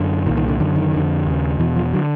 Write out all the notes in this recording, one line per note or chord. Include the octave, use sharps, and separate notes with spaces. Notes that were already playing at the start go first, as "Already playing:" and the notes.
Already playing: F#2 D3
C2 A#2 D#3
D#3
D3
F#2 D3 D#3
D#3
F2 D3
D#2 C#3
E2 B2 E3
F3
D3 F#3